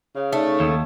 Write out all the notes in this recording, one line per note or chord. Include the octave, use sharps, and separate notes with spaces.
C#3 F5
A3 D#4
D#2